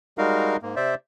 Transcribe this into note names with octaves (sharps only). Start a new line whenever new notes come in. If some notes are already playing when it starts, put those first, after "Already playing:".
G3 G#3 D#4 F#4 A#4 F5
G#2 A#3
C3 C5 D5 E5